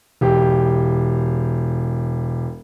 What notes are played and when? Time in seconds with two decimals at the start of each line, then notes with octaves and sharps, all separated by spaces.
0.21 E1 G4